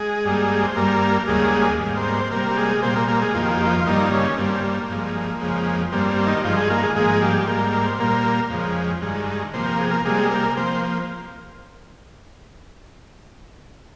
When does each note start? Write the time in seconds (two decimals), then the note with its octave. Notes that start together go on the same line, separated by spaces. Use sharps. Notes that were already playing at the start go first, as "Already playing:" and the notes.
Already playing: G#3 G#4
0.25 G2 G3 A#3
0.62 C5
0.76 G2 G3 A#3 A#4
1.28 D#2 C#3 G3 G#3 A#3 G#4
1.79 G#2 G3 A#3
1.96 C4 C5
2.08 A#4
2.14 C4 C5
2.31 C3 G3 A#3 A#4
2.51 G4
2.57 G#3 G#4
2.82 A#2 G3 A#3 C4 C5
2.96 A#3 A#4
3.08 A#3 A#4
3.21 G#3 G#4
3.34 F2 D#3 A#3 F4
3.42 G4
3.50 F4
3.58 G4
3.66 F3 F4
3.86 G2 D#3 G3 A#3 D#4
4.12 C#3 C#4
4.37 G2 G3 A#3 C4
4.64 A#3
4.89 G2 F3 G#3
5.41 F2 C#3 F3 G#3
5.92 G2 G3 A#3 C4
6.10 C4
6.27 D#3 D#4
6.37 G4
6.44 G2 D#3 F3 G#3 F4
6.57 G#3 G#4
6.70 A#3 A#4
6.83 G#3 G#4
6.96 G#2 F3 G#3 A#3 G#4
7.22 G3 G4
7.47 G#2 G3 A#3 A#4
7.73 A#4
7.86 C5
7.99 A#2 G3 A#3 A#4
8.50 F2 C#3 F3 G#3
9.02 G2 D#3 G#3
9.54 C3 F3 A#3 C5
9.66 A#4
9.79 G#4
9.91 A#3 A#4
10.05 C3 G3 G#3 A#3 G#4
10.31 A#3 A#4
10.56 F3 A#3 C4 C5